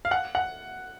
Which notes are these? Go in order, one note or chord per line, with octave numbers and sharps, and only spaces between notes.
F5
F#5
F#5